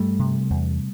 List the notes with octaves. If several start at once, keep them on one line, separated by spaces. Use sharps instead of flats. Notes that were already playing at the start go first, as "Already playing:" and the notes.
Already playing: G2 G3 A3
C3
E2